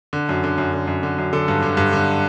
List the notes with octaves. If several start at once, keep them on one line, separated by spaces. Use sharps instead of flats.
D3
F#2
D3
F#2
D3
F#2
D3
F#2
D3 A4
G2
D3
G2
D3